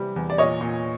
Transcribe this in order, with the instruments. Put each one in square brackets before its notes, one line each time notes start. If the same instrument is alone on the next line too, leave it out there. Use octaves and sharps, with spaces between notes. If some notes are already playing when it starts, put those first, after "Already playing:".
Already playing: [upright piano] C3 E3 G3
E2
D5
A#2 C#5 D#5
A#2